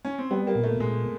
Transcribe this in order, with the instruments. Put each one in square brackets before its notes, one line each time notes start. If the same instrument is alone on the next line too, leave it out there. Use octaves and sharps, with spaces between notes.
[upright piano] C#4
C4
[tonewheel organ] G3 [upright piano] B3
[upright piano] A#3
[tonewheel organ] A#2
[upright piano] A3
[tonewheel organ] A#2 [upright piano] G#3